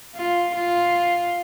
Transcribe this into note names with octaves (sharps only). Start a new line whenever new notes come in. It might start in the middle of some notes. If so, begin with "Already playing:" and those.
F4
F4